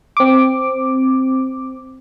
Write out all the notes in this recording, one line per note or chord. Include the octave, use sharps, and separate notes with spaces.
C4 D6